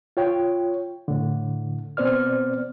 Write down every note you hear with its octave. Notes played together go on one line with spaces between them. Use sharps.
F4 C#5 G5
A2 D3
B2 B3 C4 C5 D5 F6